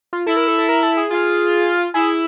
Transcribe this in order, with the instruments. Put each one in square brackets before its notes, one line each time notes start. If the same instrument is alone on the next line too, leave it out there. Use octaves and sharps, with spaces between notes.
[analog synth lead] F4
[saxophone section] E4 [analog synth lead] A4
[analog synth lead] A#4
A4
A4
A#4
A4
G#4
[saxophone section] F4
[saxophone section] E4 [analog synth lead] G#4